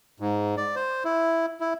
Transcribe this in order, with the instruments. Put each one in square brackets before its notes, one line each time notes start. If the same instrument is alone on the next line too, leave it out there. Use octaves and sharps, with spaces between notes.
[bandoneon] G#2
D5
C5
E4
E4